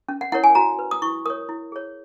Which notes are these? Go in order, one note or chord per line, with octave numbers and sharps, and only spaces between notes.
C#4
F#5
E4 A#4 C#5 F#5
G#5
F#4 A#5
B4
D#6
E4 C#6
A#4 C#5 D#6
E4
G#4 C#5